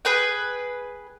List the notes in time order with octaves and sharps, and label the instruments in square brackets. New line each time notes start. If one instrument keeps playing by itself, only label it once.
[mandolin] G#4 B4 G5